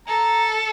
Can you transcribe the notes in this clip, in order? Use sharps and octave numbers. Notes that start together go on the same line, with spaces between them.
A4 A#5